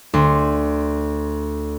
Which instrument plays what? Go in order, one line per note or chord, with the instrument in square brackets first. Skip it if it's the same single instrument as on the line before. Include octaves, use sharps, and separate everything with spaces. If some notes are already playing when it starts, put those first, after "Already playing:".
[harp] D2 C6